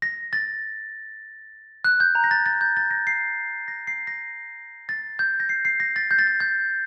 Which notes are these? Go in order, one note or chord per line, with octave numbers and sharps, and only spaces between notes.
A#6
A6
F#6
G6
A#5
A#6
A6
A6
G6
A6
A#6
C7
A#6
C7
A#6
A6
G6
A#6
C7
C7
A#6
A6
G6
A6
G6
G6